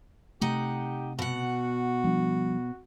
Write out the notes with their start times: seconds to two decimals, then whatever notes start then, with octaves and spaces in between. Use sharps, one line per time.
0.41 C3 A3 D#4 G4 F#5
1.19 B2 F#4 F#5
2.04 F3 G3 D4